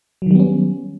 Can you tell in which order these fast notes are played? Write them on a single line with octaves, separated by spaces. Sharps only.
F#3 D#3 G3 B3 C#4